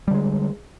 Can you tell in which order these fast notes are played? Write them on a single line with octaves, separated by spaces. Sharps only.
G3 D3 G#3